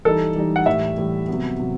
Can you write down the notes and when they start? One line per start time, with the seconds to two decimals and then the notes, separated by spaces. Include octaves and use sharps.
0.05 E3 G3 D#4 A4
0.36 E3 G3 D#4
0.56 F#5
0.66 A2 E3 G3 E5
0.98 A2 E3 G3
1.28 C3 F#3 B3
1.59 C3 F#3